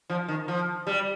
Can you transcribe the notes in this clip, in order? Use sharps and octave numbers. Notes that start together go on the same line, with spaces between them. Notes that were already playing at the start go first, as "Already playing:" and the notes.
F3
D#3
F3
G3